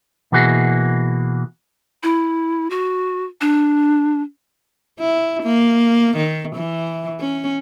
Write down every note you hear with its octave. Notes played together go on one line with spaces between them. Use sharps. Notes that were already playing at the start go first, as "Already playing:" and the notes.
B2 E3 A#3 F#4 G#4
E4
F#4
D4
E4
A#3
D#3
E3
C#4